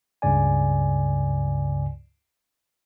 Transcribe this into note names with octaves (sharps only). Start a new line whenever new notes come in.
C#2 G2 C#3 D5 G#5